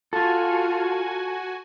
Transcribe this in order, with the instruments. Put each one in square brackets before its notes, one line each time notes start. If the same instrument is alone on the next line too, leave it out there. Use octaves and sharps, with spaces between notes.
[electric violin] F4 [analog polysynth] F#4 G#5 [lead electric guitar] A4